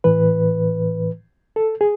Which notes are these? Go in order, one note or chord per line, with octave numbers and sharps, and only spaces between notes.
A2 E3 B4
A4
G#4